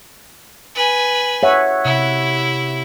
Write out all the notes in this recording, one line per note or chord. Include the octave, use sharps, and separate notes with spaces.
B4 G#5
C#5 E5 F#5
C3 E4